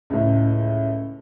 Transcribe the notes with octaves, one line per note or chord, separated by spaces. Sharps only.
C#2 A2